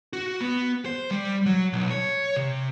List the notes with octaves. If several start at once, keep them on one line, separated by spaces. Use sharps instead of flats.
F#4
B3
C5
G3
F#3
B1
C#5
C3